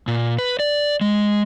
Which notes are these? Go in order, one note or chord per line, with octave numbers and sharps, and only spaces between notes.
A#2
B4
D5
G#3